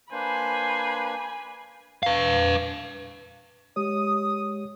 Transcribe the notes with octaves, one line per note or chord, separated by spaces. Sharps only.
A#3 D4 B4 C5 G#5 B5
B4 F5
G#3 G4 C#5 D#6